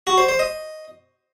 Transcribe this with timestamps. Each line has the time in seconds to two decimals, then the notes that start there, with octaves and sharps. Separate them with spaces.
0.07 F#4
0.18 C5
0.28 C5
0.39 D#5